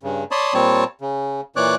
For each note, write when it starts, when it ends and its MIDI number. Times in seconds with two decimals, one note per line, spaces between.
0.03 0.24 43
0.03 0.24 49
0.31 0.54 73
0.31 0.54 74
0.31 0.54 81
0.31 0.54 83
0.31 0.54 84
0.31 0.54 87
0.54 0.84 46
0.54 0.84 55
0.54 0.84 60
0.54 0.84 73
0.54 0.84 81
1.01 1.41 49
1.56 1.75 46
1.56 1.75 52
1.56 1.75 73
1.56 1.75 74
1.56 1.75 86
1.56 1.75 90